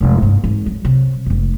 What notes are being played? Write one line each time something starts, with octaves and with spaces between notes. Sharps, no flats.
F1 G#3
G2 A#3
G#1 F#3
F#3
C3 F#3
F1 F2